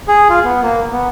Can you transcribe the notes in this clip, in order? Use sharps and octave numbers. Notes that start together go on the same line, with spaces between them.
G#4
F4
B3
A#3
B3